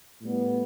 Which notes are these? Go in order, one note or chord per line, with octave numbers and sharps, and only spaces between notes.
A2 G3 B3